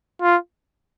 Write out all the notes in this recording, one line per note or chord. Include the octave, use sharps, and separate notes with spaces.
F4